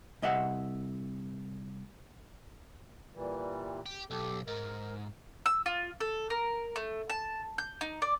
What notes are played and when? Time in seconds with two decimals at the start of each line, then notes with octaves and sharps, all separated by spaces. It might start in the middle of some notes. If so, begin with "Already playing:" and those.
0.22 C2 D#5 E5 F#5
3.14 A#2 E3 G3
3.86 G4
4.10 B1 G4 A4
4.48 G#2 A#4
5.46 E6
5.66 F4
6.00 A4
6.30 A#4
6.76 A3
7.10 A5
7.58 G6
7.81 D#4
8.02 D5